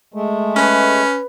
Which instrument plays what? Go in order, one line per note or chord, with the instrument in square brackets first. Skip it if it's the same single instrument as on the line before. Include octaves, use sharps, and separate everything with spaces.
[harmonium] G#3 A3
[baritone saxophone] C#4 [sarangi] B4